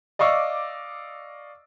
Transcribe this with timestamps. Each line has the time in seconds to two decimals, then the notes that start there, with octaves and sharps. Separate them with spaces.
0.19 D5 D#5 F5 C#6 D6 E6